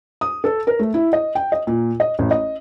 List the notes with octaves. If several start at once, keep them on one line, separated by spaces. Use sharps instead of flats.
D#6
A4
A#4
A3
E4
D#5
G5
D#5
A#2
D#5
A1
D#5